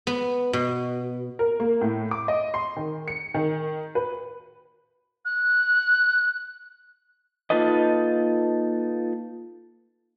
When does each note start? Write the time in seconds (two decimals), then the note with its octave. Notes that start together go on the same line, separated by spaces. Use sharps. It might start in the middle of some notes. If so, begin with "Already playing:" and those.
0.07 B3
0.53 B2
1.39 A#4
1.60 A#3
1.81 A2
2.11 D6
2.28 D#5
2.54 C6
2.76 D#3
3.08 C#7
3.34 D#3
3.95 B4
5.25 F#6
7.50 A#3 D#4 F4 A4 B4 D#5